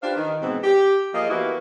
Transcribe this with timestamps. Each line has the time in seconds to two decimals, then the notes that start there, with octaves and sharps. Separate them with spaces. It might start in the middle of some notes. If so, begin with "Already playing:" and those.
0.03 D4 F4 G4 B4 C5 F5
0.16 D#3
0.42 G#2 B2 E3 G#3 B3 C4
0.63 G4
1.14 F3 A#3 G#4 D#5
1.30 E3 G3 A#3 B3 E4 F#4